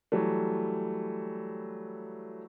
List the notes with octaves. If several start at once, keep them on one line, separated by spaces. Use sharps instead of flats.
E3 F#3 G3 A3